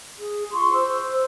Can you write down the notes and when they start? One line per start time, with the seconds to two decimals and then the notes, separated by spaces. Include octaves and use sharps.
0.17 G#4
0.51 F4 C6 C#6
0.73 C5 E6